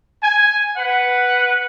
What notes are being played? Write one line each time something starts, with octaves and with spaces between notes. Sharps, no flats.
G#5
B4 F#5